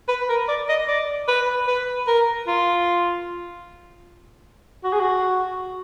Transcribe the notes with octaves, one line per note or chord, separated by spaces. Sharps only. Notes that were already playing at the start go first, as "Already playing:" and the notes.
B4
A#4
D5
D#5
D5
B4
B4
A#4
F4
F#4
G#4
F#4